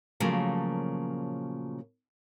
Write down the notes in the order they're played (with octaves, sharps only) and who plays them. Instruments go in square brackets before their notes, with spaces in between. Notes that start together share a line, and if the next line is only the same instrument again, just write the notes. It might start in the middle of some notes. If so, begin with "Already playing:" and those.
[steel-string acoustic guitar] A#2 C#3 F3 F#3 A3 A#3